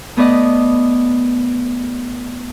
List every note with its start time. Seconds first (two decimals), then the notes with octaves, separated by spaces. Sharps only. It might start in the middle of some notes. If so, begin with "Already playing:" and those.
0.17 A3 B3 B4 D5 D#5